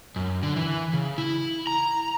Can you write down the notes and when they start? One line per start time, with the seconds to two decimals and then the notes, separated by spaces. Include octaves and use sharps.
0.16 F#2
0.43 D3
0.56 E3
0.93 C#3
1.18 E4
1.67 A#5